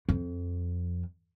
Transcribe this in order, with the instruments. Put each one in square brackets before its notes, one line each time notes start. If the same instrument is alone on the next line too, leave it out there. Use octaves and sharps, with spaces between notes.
[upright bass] F2